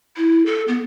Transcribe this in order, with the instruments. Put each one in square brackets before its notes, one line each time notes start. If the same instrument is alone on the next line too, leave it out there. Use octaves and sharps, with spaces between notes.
[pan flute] E4
A4
B3